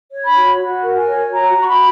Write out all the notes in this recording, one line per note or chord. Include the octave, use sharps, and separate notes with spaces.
C#5
B5
F#4
F#4
A#4
G#5
C#5
F#4 A#5
F#4 C#6
B5